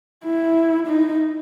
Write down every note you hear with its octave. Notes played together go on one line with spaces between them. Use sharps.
E4
D#4